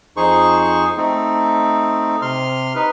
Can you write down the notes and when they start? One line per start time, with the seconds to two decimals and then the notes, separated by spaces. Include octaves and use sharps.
0.17 F2 D#4 G#4 C5 C#6
0.97 A3 C4 D#4
2.22 C3 C6 F6
2.75 D#4 B4